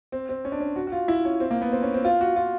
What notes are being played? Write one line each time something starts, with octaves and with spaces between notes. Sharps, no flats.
C4
C4
C#4
D4
C#4
F#4
F#4
F4
E4
C#4
C4
A#3
B3
C4
C#4
C4
F4
F#4
F4